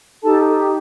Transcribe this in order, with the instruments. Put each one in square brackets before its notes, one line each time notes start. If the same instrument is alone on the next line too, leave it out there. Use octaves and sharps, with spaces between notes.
[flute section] D#4 G4 A4 A5